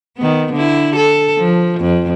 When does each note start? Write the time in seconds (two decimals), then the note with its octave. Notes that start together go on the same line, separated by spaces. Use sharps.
0.17 D#3 B3
0.54 D3 E4
0.96 A4
1.38 F3
1.81 F2